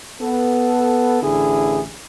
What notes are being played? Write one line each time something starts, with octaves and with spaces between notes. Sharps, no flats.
B3 A4
A1 D3 E4 G#4